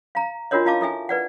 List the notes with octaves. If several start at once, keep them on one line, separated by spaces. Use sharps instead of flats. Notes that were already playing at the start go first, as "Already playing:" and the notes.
F5 A#5
D4 F4 F#4 A#4 C#5 D#5
E4 D#5 F5 A5 D6
E4 A4 E5 G#5
B4 D5 F#5